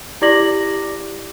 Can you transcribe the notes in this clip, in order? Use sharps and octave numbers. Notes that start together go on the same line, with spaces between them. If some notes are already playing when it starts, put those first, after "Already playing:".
E4 G4 D5 D6 A#6 F#7